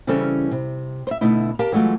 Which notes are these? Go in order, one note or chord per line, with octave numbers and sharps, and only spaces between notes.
C#3 E3 G3 C4 C#4 A4
C3
C5 E5
B2 D3 A3 D#4 E4
G4 A#4 F5 A5
E3 F#3 G#3 A3 F4